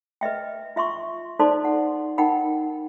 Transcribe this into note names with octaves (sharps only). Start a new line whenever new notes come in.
B4 D#5 E5 G5
F4 E5 C6 C#6
D#4 A4 C5 D5 A5 C6
F#5
D#4 A#4 F#5 G5 B5